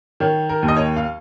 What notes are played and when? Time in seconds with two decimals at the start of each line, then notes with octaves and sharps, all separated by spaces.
0.20 D#3 C#5
0.49 A#4
0.63 D#2
0.68 D#5
0.77 C#5
0.97 F5